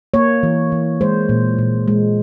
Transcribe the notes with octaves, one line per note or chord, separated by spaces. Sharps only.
A#3 C#5
E3
E3
G#3 C5
A#2
A#2
G#3